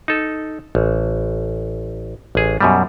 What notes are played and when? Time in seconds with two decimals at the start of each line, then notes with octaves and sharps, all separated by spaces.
0.08 D#4 A4
0.75 A1
2.35 A1 G#4
2.61 F#2 B2 G3